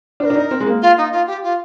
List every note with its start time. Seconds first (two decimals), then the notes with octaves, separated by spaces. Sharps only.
0.20 D4 C5
0.25 A#4
0.30 D4
0.35 D#4
0.51 C4
0.60 G#3
0.66 A#3
0.82 F4
0.97 D#4
1.11 F4
1.27 G4
1.43 F4